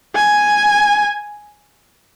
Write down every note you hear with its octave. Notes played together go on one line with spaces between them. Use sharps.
G#5